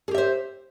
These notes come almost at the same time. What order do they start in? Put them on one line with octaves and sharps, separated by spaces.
G#4 G4 E5 C5